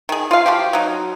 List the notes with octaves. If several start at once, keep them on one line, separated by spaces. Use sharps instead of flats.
D#3 G#4
F4 F5
F3 F#4 G4
F#3 D#4